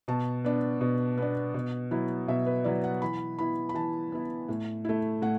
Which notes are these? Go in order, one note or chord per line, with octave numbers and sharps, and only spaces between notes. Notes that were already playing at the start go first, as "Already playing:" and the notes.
B2 A5
B3 D4
B2
B3 D4
B2
F#3 B3 E4
B2 E5
B4
F#3 B3 E4 D5
F#5
E3 B5
B3 E4 B5
B5
E3 A5
B3 E4
A2
A3 E4
A2 F#5